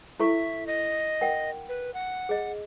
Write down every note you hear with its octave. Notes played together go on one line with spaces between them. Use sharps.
E4 A4 E5 C#6
D#5
A#4 F#5 G5
B4
F#5
G#4 D#5